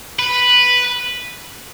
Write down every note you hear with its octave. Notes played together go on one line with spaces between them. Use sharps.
B4